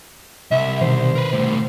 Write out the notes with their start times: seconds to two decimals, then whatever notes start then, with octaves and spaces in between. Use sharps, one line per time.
0.51 C2 E5
0.81 B2 D#3 C5
1.15 A#4 B4
1.33 C2 A2 C5